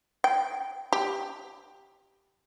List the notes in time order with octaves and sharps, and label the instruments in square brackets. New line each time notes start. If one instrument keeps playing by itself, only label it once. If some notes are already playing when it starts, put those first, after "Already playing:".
[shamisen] G5
G4